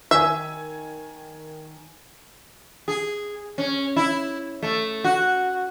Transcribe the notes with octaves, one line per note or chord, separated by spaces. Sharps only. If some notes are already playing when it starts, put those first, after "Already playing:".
D#3 E5 G#5
G#4
C#4
E4
A3
F#4